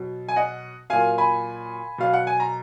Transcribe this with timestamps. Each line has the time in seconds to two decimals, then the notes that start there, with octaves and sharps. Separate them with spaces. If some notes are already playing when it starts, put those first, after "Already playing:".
Already playing: B2 F#3
0.29 G#5
0.36 D#5 F#5
0.90 A#2 F#3 F5 G#5
1.18 G#5 B5
1.98 B2 F#3 F5
2.13 F#5
2.27 G#5
2.40 A#5